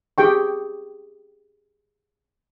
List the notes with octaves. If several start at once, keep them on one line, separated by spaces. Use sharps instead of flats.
G4 G#4 G5 C#6